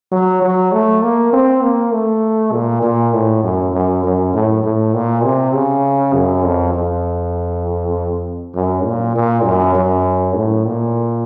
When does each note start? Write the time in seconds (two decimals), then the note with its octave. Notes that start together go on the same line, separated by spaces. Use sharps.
0.12 F#3
0.41 F#3
0.72 A3
1.02 A#3
1.33 C4
1.62 A#3
1.93 A3
2.52 A#2
2.82 A#2
3.13 A2
3.43 F#2
3.73 F#2
4.03 F#2
4.33 A2
4.63 A2
4.94 A#2
5.24 C3
5.54 C#3
6.14 F#2
6.44 F2
6.74 F2
8.55 F#2
8.86 A#2
9.16 A#2
9.45 F#2
9.75 F#2
10.36 A2
10.65 A#2